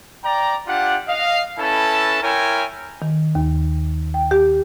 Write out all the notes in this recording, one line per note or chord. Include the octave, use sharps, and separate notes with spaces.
D5 G5 A#5
D4 F4 G4 F#5
D#5 F5
C#4 E4 A4 B4 A5
E4 A#4 C#5 G5 G#5
D#3
D#2
G5
G4